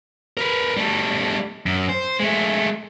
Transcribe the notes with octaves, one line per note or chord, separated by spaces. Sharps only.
A#4 B4
G3 A3
F#2
C5
G#3 A3